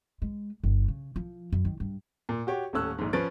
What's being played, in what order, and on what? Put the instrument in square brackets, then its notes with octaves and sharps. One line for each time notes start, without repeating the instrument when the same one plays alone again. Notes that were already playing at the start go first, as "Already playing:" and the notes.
[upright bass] G#3
G1
C#3
F3
F#2
D#3
G2
[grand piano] A#2
F#4 G4 C#5
D#1 A2 A3 C#4 E6 F#6
A#1 G#2
F3 C#4 B4 C5 A6 D7